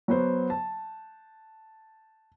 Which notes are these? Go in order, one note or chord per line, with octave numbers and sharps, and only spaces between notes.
F#3 B3 C5
A5